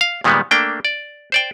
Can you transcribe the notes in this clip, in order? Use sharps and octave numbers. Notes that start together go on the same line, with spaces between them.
F5
A#2 D#3 G3 G#3 B3
A3 A#3 D4 G5
D5
C5 D5 G5